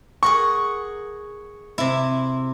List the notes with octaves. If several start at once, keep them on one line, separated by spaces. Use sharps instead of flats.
G#4 A#4 F#5 C#6
C3 E4